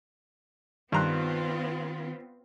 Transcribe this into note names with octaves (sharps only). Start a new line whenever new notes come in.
G2 D#3 B3 C4 F4 A#5 C6 F#6